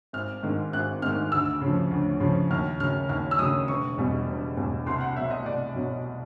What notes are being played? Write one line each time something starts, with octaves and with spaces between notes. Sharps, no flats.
G#1 F6
G#2 D#3
G#1 F#6
G#2 D#3 F6
D2 E6
C#3 F3
D2
C#3 F3
D#2 F6
C#3 F#3 F6
D#2 F6
E6
C#3 F#3 D#6
E1 C#6
E2 B2 G3
E1
E2 B2 G3
C2 C6
F#5
B2 F#3 E5
D#5
C2 D5
B2 F#3